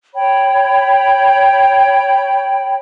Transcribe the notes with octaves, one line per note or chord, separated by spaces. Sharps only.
C#5 G5 B5